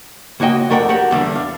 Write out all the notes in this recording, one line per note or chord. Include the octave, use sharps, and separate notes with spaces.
C#2 A#3 F#4 D#5 G5
F2 A3 A#4 D5 F#5 G5
F#4 G4 A#4 F#5
E2 D3 G3 D4
F5